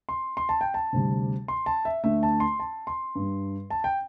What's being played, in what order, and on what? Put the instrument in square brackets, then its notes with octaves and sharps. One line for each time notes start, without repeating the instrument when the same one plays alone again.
[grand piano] C6
C6
A5
G5
A5
D2 C3 G3
C6
A5
E5
D2 D3 A3 E5
A5
C6
A5
C6
G2 G3
A5
G5